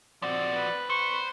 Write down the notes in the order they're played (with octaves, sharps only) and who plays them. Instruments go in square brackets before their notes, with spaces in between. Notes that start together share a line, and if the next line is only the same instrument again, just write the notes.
[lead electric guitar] F3 F#4 [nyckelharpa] C4 [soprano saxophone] D5
[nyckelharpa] B4
[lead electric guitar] C5 [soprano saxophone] C#6